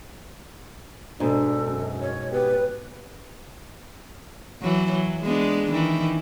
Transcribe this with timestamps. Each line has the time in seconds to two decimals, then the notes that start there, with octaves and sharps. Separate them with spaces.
1.20 G#2 B2 D4 A4
1.66 F#2
2.01 C#5
2.32 B3 G4 B4
4.62 E3 F#3
4.92 F#3
5.24 G#3 B3 D4
5.70 D#3 E3